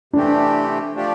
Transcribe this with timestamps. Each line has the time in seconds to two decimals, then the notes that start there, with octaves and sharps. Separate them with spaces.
0.13 C3 E3 A3 C4 D4 G4
0.95 F3 A3 D4 G4